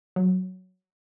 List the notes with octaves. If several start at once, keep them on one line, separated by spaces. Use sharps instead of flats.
F#3